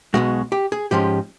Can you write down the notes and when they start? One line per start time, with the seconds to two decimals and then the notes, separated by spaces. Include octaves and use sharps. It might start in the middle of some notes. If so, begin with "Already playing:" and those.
0.14 B1 B2 G#3 F#4
0.52 G4
0.72 G#4
0.91 G#2 F3 G#3 C#4 G4